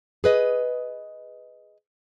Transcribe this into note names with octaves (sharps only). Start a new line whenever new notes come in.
G#4 B4 D#5